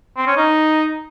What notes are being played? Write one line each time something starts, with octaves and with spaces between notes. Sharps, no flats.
C4
C#4
D#4